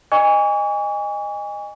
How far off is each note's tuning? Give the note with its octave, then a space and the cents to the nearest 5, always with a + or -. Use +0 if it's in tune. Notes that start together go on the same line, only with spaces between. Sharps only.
D#5 -15 G#5 -25 C#6 +40